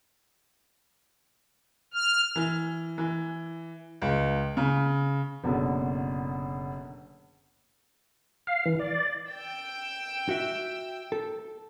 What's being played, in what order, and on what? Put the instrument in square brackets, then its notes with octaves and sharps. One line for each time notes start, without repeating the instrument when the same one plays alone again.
[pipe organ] F6
[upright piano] E3
E3
C#2
C#3
[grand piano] F#1 B2 D3
[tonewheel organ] F5
E3
D5
[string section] G5 E6
[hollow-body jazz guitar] F#4 E5
A4